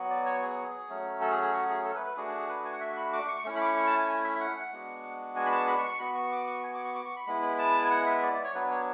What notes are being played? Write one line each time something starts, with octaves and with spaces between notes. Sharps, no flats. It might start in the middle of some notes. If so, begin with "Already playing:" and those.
Already playing: F#3 B3 F#4
D5
C#5
G#4
F#3 A3 C#4
A4
G#4
G#4
F#4
G#4
A4
B4
B4
A3 D4 F#4 G#4
G#4
G#4
B4
G#5
F#5
E5
B5
D6
C#6
A3 C#4 E4 C#6
B5
D6
C#6
C#6
A5
G#5
G#5
E5
F#5
F#5
G#3 B3 D4 F#4
G#5
B5
A5
B5
C#6
C#6
B3 F#4 B5
C#6
D6
C#6
G#5
D6
C#6
D6
C#6
B5
G#3 B3 E4 B5
B5
A5
G#5
F#5
E5
D5
D5
C#5
F#3 B3 D4 B4
C#5